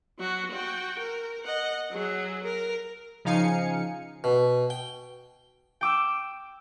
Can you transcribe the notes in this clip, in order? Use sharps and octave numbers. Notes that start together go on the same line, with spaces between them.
F#3 F#4
F#4 G5
A#4
D#5 F#5
F#3 G#4
A#4
C#3 F3 D#4 F5 G#5 C#7
B2
G5
G5 D6 E6